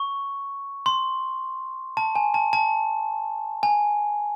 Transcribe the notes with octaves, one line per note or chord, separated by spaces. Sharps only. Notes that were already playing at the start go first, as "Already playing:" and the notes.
Already playing: C#6
C6
A5
G#5
A5
A5
G#5